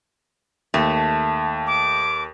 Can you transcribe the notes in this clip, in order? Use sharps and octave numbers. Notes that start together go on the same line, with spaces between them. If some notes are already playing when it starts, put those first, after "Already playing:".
D#2 A3
D6